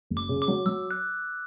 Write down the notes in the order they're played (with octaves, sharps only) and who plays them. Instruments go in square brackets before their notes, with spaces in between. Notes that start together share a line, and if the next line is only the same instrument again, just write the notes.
[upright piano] F#1
[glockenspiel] D6
[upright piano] C#3
[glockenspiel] D6
[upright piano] F#3
[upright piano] F#3 [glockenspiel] E6
[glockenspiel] F#6